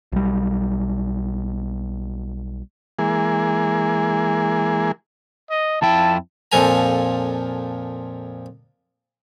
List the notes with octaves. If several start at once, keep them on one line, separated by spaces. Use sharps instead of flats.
B1 G3
E3 G#3 A#3 G#4
D#5
F2 F3 E4 G5 A5
F2 A#2 F3 A4 G#5 A#5